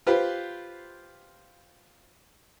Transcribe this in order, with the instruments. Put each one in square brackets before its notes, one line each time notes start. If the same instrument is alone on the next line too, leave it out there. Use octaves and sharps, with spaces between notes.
[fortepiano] F4 G4 B4 C5